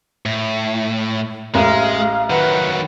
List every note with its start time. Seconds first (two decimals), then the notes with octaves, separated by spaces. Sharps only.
0.26 A2
1.55 A1 G#3 F5
2.30 D#3 F#3 B4 F#5